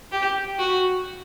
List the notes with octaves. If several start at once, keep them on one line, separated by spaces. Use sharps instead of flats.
G4
F#4